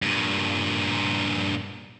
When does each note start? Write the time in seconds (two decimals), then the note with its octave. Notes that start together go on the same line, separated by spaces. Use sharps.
0.02 G2 A#2